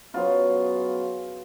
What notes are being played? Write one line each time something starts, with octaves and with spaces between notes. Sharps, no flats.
C#3 F#3 B3 F4